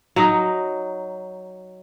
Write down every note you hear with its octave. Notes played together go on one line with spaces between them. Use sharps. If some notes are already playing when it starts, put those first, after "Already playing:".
F#3 D#4